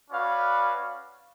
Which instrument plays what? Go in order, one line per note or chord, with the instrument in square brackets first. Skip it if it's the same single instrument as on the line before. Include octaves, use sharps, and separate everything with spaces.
[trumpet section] C#4 F#4 B4 D5 F5